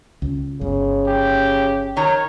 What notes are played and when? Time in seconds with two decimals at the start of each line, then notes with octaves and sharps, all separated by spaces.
0.22 C#2
0.61 G1 C#3
1.07 G4
1.97 D#3 C#5 A#5